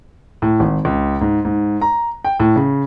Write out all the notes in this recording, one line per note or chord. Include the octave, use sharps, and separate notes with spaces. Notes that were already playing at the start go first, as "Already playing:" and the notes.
A2
G#1
C#2
G#2
G#2
A#5
G5
A2
C#3